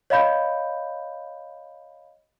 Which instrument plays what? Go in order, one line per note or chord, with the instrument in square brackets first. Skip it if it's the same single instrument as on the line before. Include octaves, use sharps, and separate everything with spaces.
[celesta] C#5 D#5 F5 B5 G6